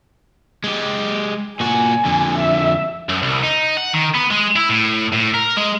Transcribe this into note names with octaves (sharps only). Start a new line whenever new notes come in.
G#3 G4
A#2 F#4 G#5
F2 D3
E5
F#2
C2
D#4
F#5
D#3
B3
G#3
E4
A2
A2
A#4
G#3